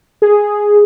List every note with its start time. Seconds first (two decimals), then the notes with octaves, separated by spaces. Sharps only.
0.22 G#4